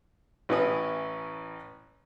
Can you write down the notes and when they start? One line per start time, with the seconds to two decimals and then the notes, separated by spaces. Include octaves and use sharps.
0.49 A1 E3 C#4 E4 B4 D#6